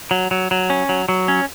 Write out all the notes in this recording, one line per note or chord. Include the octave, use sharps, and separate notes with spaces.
F#3
F#3
F#3
C#4
F#3
F#3
C#4